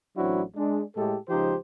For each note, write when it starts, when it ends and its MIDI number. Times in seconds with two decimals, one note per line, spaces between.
0.17 0.41 33
0.17 0.41 54
0.17 0.41 60
0.17 0.41 62
0.17 0.41 64
0.17 0.41 66
0.56 0.81 56
0.56 0.81 62
0.96 1.16 45
0.96 1.16 56
0.96 1.16 67
0.96 1.16 69
1.29 1.55 37
1.29 1.55 53
1.29 1.55 63
1.29 1.55 67
1.29 1.55 72